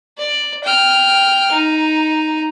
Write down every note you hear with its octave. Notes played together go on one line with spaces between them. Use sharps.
D5
G5 F6
D#4